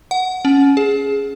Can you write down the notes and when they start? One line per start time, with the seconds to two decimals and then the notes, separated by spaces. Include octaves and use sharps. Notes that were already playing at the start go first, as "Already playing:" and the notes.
0.11 F#5
0.45 C#4
0.77 G#4